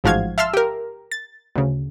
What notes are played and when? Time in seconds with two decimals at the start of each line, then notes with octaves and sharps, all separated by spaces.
0.04 A1 G#2 F3 F#4 F5 G#6
0.38 E5 F5 A5 C6 E6 F6
0.54 G4 A#4
1.12 A6
1.56 D2 C#3